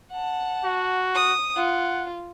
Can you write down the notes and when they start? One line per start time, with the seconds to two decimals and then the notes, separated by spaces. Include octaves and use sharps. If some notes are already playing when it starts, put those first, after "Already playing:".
0.11 F#5 A5
0.64 F#4
1.15 D#6
1.56 F4 F#5